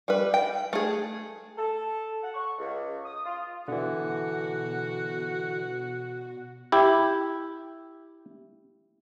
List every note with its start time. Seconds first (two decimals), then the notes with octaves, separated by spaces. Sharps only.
0.08 G3 B4
0.34 G5
0.73 A3 G#4
1.58 A4
2.22 F#5
2.34 C#6
2.58 C#2
3.04 D#6
3.25 F4
3.68 B2 D3 E3 F#4
6.72 E4 G4